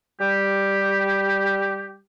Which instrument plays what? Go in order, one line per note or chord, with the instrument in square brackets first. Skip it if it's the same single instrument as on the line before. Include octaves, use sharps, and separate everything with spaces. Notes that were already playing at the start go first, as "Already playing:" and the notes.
[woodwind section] G3 G4